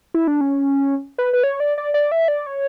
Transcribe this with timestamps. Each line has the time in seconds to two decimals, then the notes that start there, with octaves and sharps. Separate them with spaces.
0.14 E4
0.27 D4
0.41 C#4
1.18 B4
1.33 B4
1.43 C#5
1.60 D5
1.78 D5
1.94 D5
2.12 E5
2.28 D5
2.46 C#5